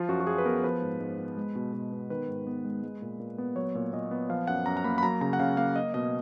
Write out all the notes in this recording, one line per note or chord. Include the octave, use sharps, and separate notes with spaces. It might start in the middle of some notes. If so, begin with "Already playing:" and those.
Already playing: F3 F4
F#2 F#4
F#4
F#2 G#4
B4
B3 A#4
F3 B4
G#2
G#2
B3
G#3
B2
B2
B3
D#3 B4
G#2
B3
G#3
G#3
A#2
A#2
B3
F#3 C#5
A#2
A#2 D#5
B3
F3 F5
F#2 F#5
F#2 A#5
A#5
A#3 B5
B5
F#3 A#5
C#3 A#5
F#5
C#3 F5
A#3 F5
A#3 D#5
B2 D#5